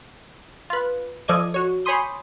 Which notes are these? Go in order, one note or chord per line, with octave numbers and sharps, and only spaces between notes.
F4 B4
F3 A4 D5 D#5 G#6 D#7
F#4 C#5
C#5 G#5 B5 C6 D#6 G6